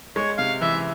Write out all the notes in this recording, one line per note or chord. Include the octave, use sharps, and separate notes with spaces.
G#3 C#5
C3 F5
E3 E5